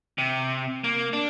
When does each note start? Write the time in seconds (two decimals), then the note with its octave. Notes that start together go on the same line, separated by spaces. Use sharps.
0.18 C3
0.84 A#3
1.13 D4